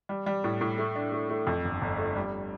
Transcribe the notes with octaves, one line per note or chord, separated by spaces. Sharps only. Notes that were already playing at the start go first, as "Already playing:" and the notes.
G3
G3
A2
A2
A3
D4
A3
A3
F2
G1
G1
A3
G3